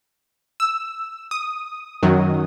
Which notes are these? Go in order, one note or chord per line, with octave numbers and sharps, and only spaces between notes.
E6
D#6
F#2 D#3 F#3